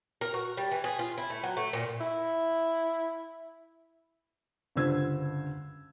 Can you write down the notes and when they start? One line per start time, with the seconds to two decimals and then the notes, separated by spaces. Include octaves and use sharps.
0.21 A#4
0.34 F#4
0.57 G3
0.71 E3
0.84 G#4
0.99 F4
1.18 E4
1.30 A3
1.43 F#3
1.57 A3
1.73 A#2
2.01 E4
4.76 C#2 G2 D3 C5 E6 G#6